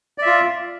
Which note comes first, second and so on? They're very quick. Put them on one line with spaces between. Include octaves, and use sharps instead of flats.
D5 E5 F4